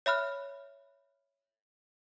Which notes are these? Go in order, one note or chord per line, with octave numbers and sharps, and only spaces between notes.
C#5 E5 B5 F6 F#6